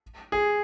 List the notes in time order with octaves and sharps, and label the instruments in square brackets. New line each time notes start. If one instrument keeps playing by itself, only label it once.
[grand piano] G#4